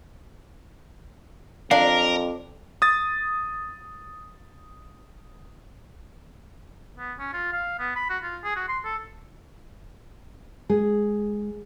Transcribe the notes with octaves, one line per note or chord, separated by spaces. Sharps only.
F2 D4 A#4 F5
D#6 A6
B3
C#4
F4
F5
B3
B5
F#4
F4
G#4
F#4
C6
A4
G#3 G#4